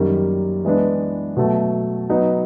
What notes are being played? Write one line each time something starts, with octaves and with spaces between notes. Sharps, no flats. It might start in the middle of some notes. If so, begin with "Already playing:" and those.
Already playing: F#2 D#3 G3 A#3
E3 G#3 B3 D4
B2 F#3 A3
F#3 B3 D#4